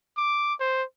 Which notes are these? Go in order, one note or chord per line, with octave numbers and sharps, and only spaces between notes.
D6
C5